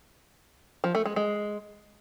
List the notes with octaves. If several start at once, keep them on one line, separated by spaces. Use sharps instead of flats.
F3
A3
G#3
G#3